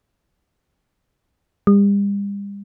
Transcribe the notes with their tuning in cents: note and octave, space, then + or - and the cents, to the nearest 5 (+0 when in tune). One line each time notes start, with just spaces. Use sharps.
G3 +40